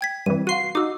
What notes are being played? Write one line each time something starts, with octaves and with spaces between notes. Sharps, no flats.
G5 G#6 B6
G2 C3 E3 D#7
F#4 F5 C6 C7 D#7
D#4 F#4 D6 E6